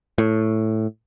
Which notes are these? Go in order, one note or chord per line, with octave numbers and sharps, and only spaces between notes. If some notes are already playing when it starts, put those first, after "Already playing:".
A2